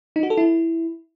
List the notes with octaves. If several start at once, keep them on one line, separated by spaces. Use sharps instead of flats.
D#4
F#4
A4
E4